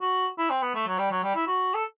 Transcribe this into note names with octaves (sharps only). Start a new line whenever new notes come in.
F#4
E4
C4
B3
A3
F#3
G3
F#3
G3
E4
F#4
A4